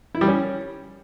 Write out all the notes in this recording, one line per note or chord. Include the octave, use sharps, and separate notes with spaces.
E4
G3
C#4